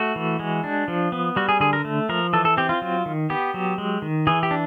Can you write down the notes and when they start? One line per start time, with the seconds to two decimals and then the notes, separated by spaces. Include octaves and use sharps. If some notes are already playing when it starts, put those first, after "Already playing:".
Already playing: A3 F#4
0.16 E3
0.39 G#3
0.64 D4
0.88 F3
1.12 B3
1.36 G3 F#4
1.49 G#4
1.60 D3 G#4
1.73 A#4
1.85 A3
2.09 F3 A#4
2.33 E3 A4
2.45 A4
2.57 C4 G4
2.69 F4
2.82 F#3
3.06 D#3
3.30 B3 G4
3.54 F#3
3.78 G#3
4.02 D#3
4.27 E3 G#4
4.43 G4
4.51 D4